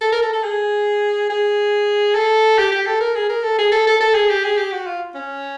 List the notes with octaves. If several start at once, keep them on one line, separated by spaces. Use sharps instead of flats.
A4
A#4
A4
A4
G#4
G#4
A4
G4
G4
A4
A#4
G#4
A#4
A4
G#4
A4
A4
A4
G#4
G4
G#4
G4
F#4
F4
C#4